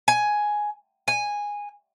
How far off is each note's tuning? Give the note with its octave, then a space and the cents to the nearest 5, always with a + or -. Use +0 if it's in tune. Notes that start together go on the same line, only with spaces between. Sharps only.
G#5 +5
G#5 -10